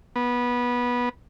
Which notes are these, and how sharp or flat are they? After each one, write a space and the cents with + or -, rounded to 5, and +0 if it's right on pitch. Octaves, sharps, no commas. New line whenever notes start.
B3 -20